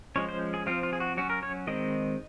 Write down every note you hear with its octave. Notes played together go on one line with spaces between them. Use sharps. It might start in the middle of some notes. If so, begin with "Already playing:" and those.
F3 G#3 C#4 C#5
C5
G#4
F3 C4 F4
F4
G#4
F#4
F#3 C#4 F#4
A#4
C#5
D#3 G#3 C4 D#5